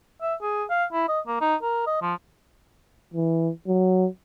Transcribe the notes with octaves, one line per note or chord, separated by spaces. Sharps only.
E5
G#4
F5
E4
D#5
A#3
D#4
A#4
D#5
F3
E3
F#3